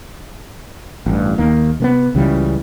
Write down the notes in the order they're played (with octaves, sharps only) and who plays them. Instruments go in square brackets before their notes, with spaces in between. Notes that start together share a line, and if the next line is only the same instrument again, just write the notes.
[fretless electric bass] A1 G2
D#2 D#3 A#3
C3 A#3 B3
C#2 C#3 E3 G3